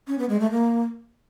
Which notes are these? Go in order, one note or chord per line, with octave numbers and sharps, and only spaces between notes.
C#4
B3
G#3
A3
A#3